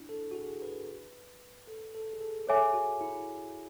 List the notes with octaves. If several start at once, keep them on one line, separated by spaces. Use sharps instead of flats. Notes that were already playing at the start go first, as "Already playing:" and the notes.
Already playing: D4 E4
A4
F#4
G#4
B4
A4
A4
G#4
A4
G#4 A4 C#5 E5 G#5 D6
F#4
E4